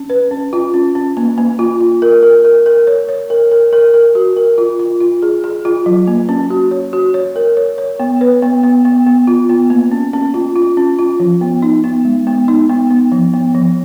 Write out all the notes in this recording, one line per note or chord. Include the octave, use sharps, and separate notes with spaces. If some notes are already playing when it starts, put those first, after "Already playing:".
Already playing: C#4
B4
C#4
F4
C#4
C#4
A#3
A#3
F4
F4
A#4
A#4
A#4
A#4
C#5
C#5
A#4
A#4
A#4
A#4
F#4
A#4
F4
F4
F4
G#4
G#4
F4
F#3
A#3
C#4
F#4
C#5
F#4
C#5
A#4
C#5
C#5
B3
B4
B3
B3
B3
B3
F4
B3
A#3
C#4
C#4
F4
F4
C#4
F4
F3
B3
D#4
B3
G#3
B3
D#4
B3
B3
F3
B3
F3